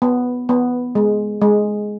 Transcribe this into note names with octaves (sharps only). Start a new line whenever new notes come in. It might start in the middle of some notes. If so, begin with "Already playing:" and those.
B3
B3
G#3
G#3